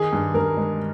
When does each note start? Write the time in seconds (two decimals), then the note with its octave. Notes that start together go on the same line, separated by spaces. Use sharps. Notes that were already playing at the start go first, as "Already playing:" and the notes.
Already playing: D#3 G#4
0.13 G2
0.34 G2 A#4
0.57 G#3